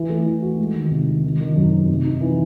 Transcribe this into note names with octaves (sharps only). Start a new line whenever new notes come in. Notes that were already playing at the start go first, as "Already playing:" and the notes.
Already playing: E3
A3
E3
F#4
G#3
D#3
C3
D#3
D#3
D#3
F#2
C4
C3
D#4
E3